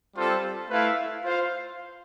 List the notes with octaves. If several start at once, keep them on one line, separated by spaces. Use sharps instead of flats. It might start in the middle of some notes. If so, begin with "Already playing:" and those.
G3 C4 F4 A4 C5
A3 E4 B4 F5
F4 C5 F5